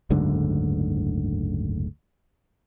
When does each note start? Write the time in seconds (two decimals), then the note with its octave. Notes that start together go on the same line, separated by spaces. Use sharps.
0.10 F#1 D2 G#2 D3